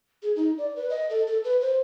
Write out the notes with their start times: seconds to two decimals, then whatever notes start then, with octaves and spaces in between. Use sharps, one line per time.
0.23 G#4
0.36 D#4
0.58 D5
0.76 B4
0.90 D#5
1.10 A4
1.27 A4
1.44 B4
1.61 C5